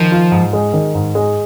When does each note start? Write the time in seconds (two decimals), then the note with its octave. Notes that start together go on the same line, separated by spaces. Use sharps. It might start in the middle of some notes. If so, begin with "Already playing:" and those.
Already playing: D#3 F3
0.12 F4
0.32 G#2
0.53 G#3
0.73 D#3
0.95 G#2
1.15 G#3